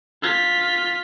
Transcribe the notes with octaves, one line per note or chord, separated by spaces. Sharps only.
F4 B6